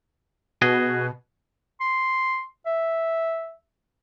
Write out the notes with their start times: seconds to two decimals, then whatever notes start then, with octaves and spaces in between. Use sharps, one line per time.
0.62 B2 F#4 G#4 D#5
1.81 C6
2.66 E5